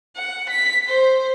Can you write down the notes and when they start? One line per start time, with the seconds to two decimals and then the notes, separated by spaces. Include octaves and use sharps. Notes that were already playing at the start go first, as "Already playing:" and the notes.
0.17 F#5
0.50 B6
0.89 C5